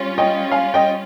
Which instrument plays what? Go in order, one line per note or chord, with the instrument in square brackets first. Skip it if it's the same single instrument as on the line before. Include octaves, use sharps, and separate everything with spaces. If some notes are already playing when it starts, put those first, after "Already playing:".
Already playing: [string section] G3 C#4 F4
[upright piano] D#5 G5
F5 G#5
D#5 G5